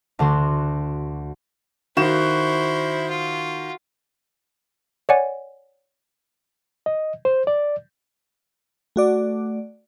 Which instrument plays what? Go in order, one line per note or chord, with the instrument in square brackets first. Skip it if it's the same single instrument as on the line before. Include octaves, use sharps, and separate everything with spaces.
[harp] D2 D3 F#4 C6
[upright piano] D#3 E7 [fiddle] E4 C5 [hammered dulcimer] F#4
[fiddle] F4
[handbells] C#5 D5 F#5 G#5
[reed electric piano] D#5
C5
D5
[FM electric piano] A3 F#4 D5